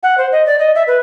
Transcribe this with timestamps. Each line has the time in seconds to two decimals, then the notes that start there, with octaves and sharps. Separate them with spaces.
0.03 F#5
0.18 C5
0.32 D#5
0.47 D5
0.59 D#5
0.75 E5
0.87 B4